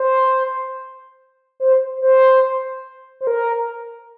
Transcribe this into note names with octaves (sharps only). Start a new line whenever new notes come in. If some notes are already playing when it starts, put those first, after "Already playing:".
Already playing: C5
C5
C5
C5
A#4